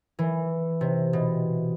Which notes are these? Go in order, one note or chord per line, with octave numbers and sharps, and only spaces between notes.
E3
C3
B2